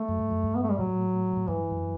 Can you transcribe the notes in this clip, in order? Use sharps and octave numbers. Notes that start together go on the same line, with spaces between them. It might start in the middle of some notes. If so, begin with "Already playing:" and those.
Already playing: A3
F#2
G2
F#2
G2
B3
A3
G3
A2 F#3
A2
G2 E3
F#2